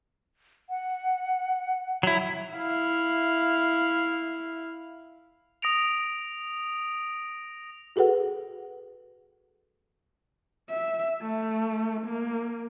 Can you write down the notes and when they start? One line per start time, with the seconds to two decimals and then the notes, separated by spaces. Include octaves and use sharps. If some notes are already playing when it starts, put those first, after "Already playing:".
0.70 F#5
2.03 F#3 E4
2.54 E4 F5
5.62 D#6 A#6 D7 F7
7.96 F#4 G#4 A4 B4 F#5
10.70 E5
11.21 A3
12.06 A#3